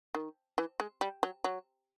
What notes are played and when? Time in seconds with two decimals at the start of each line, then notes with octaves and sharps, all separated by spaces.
0.15 D#3
0.58 E3
0.80 G#3
1.01 G3
1.23 F#3
1.44 F#3